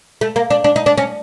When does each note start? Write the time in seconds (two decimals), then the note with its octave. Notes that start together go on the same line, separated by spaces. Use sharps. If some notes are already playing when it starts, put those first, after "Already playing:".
0.21 A3
0.36 A#3
0.50 D4
0.64 D4
0.76 D#4
0.86 D4
0.98 C#4